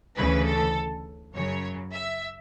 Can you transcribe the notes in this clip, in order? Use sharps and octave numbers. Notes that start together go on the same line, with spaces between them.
D2 C#3 E3 B4
A4
F#2 C#3 F#3 C#5
E5